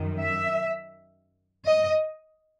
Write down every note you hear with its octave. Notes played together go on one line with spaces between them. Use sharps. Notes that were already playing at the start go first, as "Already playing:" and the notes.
Already playing: F#2 D#3
E5
D#5